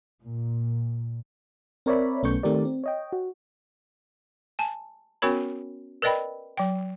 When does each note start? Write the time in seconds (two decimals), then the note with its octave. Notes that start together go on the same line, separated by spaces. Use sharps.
0.24 A#2
1.86 C4 A#4 C#5 D5 E5 B5
2.23 B1 A3 B3 C#4 C#6 G6
2.43 D#3 A3 C4 G4 A#4 D5
2.65 C4
2.84 C#5 D#5 G5
3.13 F#4
4.59 G#5 A5
5.22 B3 C#4 F#4 A#4 C#5 B5
6.02 A#4 B4 D5 D#5 G5 B5
6.57 F#3 G5